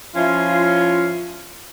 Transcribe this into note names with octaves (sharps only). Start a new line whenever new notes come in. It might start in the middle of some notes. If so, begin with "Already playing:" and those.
F3 C#4 E4 F4